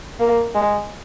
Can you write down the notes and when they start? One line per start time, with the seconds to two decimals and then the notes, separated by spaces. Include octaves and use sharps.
0.20 A#3
0.55 G#3